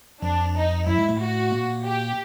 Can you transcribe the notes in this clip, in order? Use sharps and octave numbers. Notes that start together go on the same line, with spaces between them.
F2 F3 D4
D#4
F#2 F#3 E4
G#2 G#3
A2 A3
F#4
A#2 A#3
G4